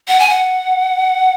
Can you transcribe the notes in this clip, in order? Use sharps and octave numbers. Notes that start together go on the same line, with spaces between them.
F#5
G#5
F#5